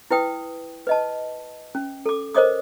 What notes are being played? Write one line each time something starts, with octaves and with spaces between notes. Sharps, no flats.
E4 B4 G5 D#6
B4 D#5 A5
C#4
A4 D6
A#4 C5 C#5 D#5 D6 D#6